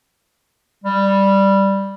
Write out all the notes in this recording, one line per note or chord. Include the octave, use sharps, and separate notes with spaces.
G3